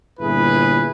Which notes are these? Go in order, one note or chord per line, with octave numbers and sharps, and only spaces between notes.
G1 A#2 E4 G#4 B4